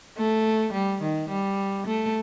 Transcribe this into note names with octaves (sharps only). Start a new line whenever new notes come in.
A3
G3
D#3
G3
A3